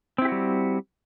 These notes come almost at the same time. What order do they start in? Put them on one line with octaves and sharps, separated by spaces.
C4 E4 G4 F#4 G3